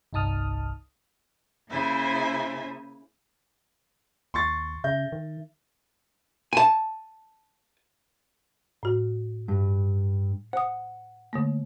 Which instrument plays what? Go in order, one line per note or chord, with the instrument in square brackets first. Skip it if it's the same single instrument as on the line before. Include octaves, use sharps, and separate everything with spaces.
[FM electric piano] G1 C2 D#4 A5 D#6 F6
[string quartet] C#3 A#3 E4 C5 E5 G#5
[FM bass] D#2 [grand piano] C6 C#6 A6
[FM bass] C#3 [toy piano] E5 [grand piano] G6
[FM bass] D#3
[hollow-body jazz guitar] G#5 A5
[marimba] A2 F#4
[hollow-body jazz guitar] G2
[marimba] C5 D#6 [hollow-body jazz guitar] F#5
[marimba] D3 A3 A#3